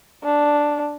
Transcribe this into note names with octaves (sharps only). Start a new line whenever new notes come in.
D4